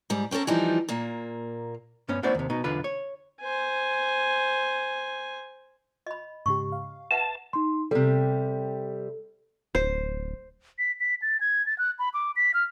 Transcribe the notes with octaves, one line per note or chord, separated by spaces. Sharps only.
G#2 G3
C4 C#4 G4 A4 A#4
E3 F3 G3 D#4
A#2 A#3
G2 B3 C#4
A3 B3 C#4 E4 C5 D5
D#2 C3
B2 D#4
B1 E2 D3 F4 B4
C#5
C5 G#5
D#5 B5
G#2 C#3 G4 C#6
F5
B4 E5 F#5 A5
D#4 C6
C3 G3 A4
D1 C5
B6
B6
A6
G#6
A6
F#6
B5
D6
B6
F6